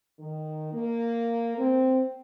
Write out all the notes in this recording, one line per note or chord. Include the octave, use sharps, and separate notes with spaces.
D#3
A#3
C4